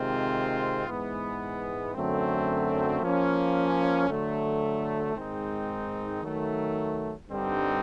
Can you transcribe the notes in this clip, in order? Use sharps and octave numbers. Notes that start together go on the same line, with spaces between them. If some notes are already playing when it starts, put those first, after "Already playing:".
Already playing: C3 D#3 G#3 C4 F4
G#2 E3 G#3 B3
F#2 D3 F#3 A3 C4
F3 A#3 C#4
D3 F#3 A3
G#2 D#3 G#3 C4 D#4
D#3 F#3 A3
G2 D3 G3 C4 D#4